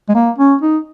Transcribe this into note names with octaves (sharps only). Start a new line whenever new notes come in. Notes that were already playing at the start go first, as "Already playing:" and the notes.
G#3
A#3
C#4
D#4